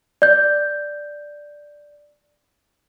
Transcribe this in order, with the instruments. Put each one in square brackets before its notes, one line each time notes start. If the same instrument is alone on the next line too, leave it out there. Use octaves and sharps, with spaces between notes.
[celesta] D5 G6